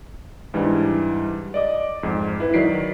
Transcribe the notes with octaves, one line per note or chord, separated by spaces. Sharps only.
G#2 E3 G3 D4
D5 D#5 D6
F2 G#2
E4 B4
D#3 F#3 D5 B6 C7 D7